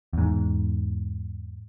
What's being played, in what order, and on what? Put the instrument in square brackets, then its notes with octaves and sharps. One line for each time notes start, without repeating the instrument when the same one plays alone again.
[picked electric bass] E2 G#2